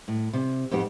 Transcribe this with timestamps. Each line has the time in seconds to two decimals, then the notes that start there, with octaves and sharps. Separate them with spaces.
0.08 A2
0.33 C3
0.71 F2 G#2 B3 G4